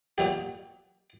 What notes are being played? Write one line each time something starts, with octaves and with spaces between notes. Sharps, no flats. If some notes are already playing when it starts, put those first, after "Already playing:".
A#2 F#3 G4